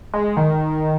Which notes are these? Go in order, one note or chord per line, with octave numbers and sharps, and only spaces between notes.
G#3
D#3